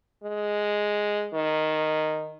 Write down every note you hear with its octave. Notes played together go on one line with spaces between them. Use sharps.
G#3
D#3